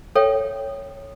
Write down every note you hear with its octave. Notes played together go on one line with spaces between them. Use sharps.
A4 C#5 E5 G5